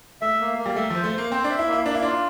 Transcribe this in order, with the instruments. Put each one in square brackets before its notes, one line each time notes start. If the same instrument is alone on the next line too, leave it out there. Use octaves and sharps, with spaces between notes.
[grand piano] A3 [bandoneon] E5
[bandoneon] A#3
A#3
[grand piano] G3
[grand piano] A3 [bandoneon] E5
[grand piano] F3 [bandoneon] C5
[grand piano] A3
[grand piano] A#3 [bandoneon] C5
[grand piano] C4 [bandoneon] C5
[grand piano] D4
[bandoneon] E5
[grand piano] E4
[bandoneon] A#3
[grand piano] E4
[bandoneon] A#3 [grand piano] D4
[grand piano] E4
[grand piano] D4 [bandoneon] F4